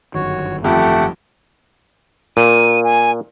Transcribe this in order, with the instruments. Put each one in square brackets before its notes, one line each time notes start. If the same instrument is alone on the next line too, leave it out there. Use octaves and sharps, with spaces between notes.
[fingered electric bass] G1 F#2 D#3 [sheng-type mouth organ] F#4 C#5
[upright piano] F2 [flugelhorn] A3 [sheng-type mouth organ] G4 F#5
[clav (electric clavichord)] A#2 [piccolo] D#7
[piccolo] G#5